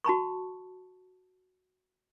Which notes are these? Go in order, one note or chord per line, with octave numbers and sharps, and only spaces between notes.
F#4 A5 B5 C#6